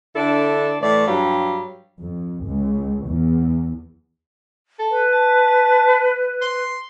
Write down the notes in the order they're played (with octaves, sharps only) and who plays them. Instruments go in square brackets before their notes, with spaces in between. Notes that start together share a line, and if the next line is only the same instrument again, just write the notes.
[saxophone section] D3 D4 E4 A4
A2 E3 A3 D5
G2 F#3 G3 F5
[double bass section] F2
C#2
E2
[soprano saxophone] A4
[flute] B4
[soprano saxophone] A5
C6